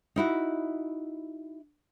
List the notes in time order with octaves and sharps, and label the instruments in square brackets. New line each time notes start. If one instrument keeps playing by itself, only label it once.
[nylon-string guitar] D#4 E4 F#4